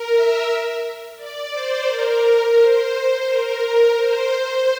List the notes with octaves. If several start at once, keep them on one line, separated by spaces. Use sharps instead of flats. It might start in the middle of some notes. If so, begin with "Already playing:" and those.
Already playing: A#4
E5
D5
C5
A#4
C5
A#4
A#4
C5